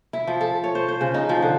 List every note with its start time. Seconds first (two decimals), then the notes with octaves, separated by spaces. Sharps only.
0.13 E4
0.27 F3
0.41 A4
0.64 C#5
0.75 C5
0.88 C5
1.01 C#3
1.14 D#4
1.29 F3
1.42 D3